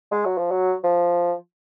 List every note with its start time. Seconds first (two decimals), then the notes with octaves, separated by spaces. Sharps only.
0.12 G#3
0.25 F#3
0.38 F3
0.51 F#3
0.84 F3